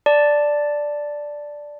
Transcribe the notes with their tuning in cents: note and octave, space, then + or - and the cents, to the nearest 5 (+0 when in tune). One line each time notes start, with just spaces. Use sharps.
D5 +0 A5 +0